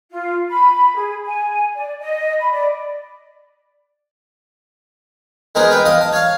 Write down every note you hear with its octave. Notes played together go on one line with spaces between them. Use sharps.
F4
B5
G#4
G#5
D5
D#5
B5
D5
G#3 B3 G#4 A#4 C5
B4 G5
D#5 F5 D#6
A5
C#5 F5